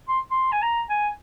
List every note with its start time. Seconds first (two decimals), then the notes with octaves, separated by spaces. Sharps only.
0.08 C6
0.31 C6
0.52 G#5
0.62 A#5
0.89 G#5